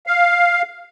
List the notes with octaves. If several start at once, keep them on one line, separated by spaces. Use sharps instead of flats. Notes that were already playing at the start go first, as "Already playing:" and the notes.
F5